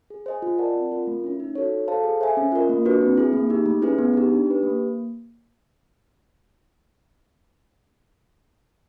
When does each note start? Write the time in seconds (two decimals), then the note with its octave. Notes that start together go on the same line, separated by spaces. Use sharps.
0.10 G#4
0.26 C5 D#5 G#5
0.42 F4
0.58 A#4 D5 F#5 A5
0.76 C4
0.92 F4 A#4
1.07 A3
1.24 C#4 E4
1.40 D#4
1.55 F#4 A4 C#5
1.72 F#4
1.88 A4 C5 F5 A5
2.04 G#4
2.21 C5 E5 G#5
2.37 C#4
2.52 F4 A#4 D#5
2.69 A#3
2.85 D4 F#4 B4
3.01 C4
3.17 E4 G#4
3.33 A#3
3.50 D#4 G4
3.66 A3
3.82 C#4 E4 G#4 B4
3.98 B3
4.14 D#4 G4
4.30 D4
4.46 G4 B4
4.63 A#3